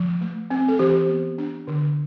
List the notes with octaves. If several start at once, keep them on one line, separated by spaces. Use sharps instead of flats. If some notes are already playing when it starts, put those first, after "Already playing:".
Already playing: F3
A3
C4
A4
E3 G4
B3
D4
D3